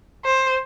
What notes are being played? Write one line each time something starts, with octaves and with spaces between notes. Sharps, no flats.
C5